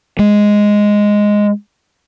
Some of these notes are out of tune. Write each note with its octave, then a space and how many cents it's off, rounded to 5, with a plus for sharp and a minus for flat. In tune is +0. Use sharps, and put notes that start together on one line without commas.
G#3 +0